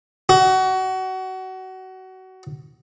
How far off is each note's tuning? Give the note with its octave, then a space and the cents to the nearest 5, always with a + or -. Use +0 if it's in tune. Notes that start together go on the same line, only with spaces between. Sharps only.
F#4 +25